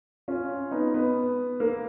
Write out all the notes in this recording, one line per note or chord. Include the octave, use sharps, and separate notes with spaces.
C#4 F4
B3 D#4
B3
A#3